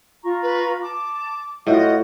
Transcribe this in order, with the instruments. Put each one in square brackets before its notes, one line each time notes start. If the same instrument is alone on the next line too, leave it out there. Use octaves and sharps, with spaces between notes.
[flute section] F4 A#5 C#6
[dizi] B4
[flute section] A5 [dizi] D6
[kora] A2 [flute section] F4 F#4 [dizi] D#5